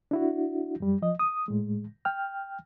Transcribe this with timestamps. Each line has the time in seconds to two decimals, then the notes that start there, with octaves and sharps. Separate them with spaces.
0.11 D4 E4 F#4
0.80 F#2 G3
1.02 F3 D#5
1.19 D#6
1.48 A2 G#3
2.05 G5 F6